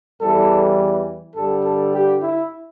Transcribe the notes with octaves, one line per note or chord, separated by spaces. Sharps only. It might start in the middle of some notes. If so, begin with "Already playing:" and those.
E2 E3 G3 A4
G2 D3 G3 A4
A4
G4
E4